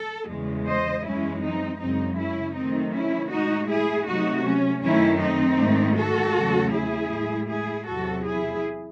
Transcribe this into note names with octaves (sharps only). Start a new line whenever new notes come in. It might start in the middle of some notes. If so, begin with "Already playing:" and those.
Already playing: A4
E2 C#3 G#3
C5 D#5
F#2 E3 G#3 C#4 E4
C4 D#4
F#2 C#3 G#3 C4 D#4
C#4 E4
C3 D#3 F#3 A3 C4 D#4
C#4 E4
A2 G#3 D#4 F#4
E4 G#4
C3 F#3 A3 D#4 F#4
C#4
F#2 D#3 A3 C#4 E4
C4 D#4
G#2 D#3 A3
F#4 A4
E2 C#3 F#3 A3
E4 G#4
A2 G#3
E4 G#4
E2 C3 F#3 F#4 A4
E4 G#4